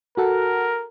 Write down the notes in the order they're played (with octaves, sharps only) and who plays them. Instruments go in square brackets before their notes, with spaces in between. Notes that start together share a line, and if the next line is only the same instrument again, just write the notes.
[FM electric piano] F#4 A4 F#5 [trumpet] A#4